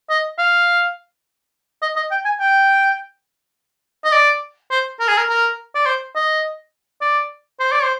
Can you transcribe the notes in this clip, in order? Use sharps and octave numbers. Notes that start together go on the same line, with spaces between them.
D#5
F5
D#5
D#5
G5
G#5
G5
D#5
D5
C5
A#4
G#4
A#4
A#4
D5
C5
D#5
D5
C5
D5
C5